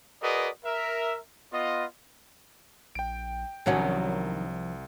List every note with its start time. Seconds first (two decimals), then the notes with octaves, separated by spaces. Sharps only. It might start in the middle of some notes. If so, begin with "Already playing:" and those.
0.23 F#4 G#4 A#4 B4 D5 D#5
0.65 A#4 E5
1.52 B3 F4 D#5
2.95 A#1 G5 D7
3.66 C2 D#3 F3 F#3 C#4 D4 C#5 F#5